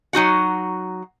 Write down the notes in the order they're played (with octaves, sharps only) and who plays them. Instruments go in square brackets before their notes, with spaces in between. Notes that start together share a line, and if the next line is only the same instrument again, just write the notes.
[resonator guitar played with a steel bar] F#3 D#4 F#4 F#5